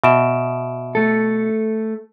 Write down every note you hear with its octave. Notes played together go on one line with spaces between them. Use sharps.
B2 E5 D7 E7
A3 A4